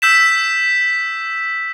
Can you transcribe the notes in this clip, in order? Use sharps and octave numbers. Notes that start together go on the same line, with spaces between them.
E6 G6 B6 E7